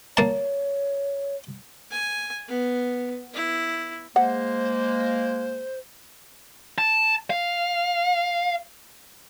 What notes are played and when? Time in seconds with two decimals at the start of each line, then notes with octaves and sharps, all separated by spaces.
0.17 A#3 C#5 A5
1.91 G#5
2.48 B3
3.34 E4
4.16 G#3 A#3 C5 F#5
6.78 A5
7.30 F5